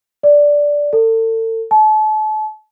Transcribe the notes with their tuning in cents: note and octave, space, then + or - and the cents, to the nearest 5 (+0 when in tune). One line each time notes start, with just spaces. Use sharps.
D5 -5
A4 +35
A5 -35